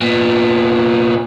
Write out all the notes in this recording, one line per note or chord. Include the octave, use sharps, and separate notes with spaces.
A#2 B3